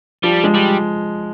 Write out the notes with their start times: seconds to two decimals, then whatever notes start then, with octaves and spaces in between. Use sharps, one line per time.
0.23 F3 G3
0.44 G#3
0.55 G3